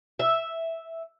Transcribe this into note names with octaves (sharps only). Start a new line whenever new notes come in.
E5